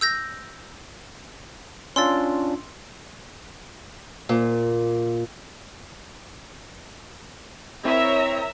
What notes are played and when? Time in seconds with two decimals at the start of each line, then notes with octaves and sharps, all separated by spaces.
0.01 E6 G6 A#6
1.96 C#4 D4 F4 C6 E6 A6
4.29 A#2
7.85 C4 E4 A#4 C#5 E5 A#5